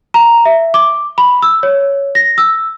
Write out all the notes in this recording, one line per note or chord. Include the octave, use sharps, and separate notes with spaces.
A#5
E5
D6
B5
E6
C#5
A#6
E6